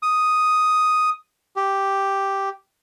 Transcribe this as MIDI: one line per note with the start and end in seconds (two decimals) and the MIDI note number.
0.03 1.10 87
1.56 2.49 67